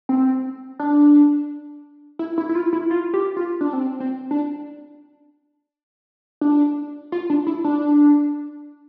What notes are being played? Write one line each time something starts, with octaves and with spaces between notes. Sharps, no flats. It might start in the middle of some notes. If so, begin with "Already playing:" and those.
C4
D4
E4
E4
E4
F4
E4
F4
G4
F4
D4
C4
C4
D4
D4
F4
D4
E4
D4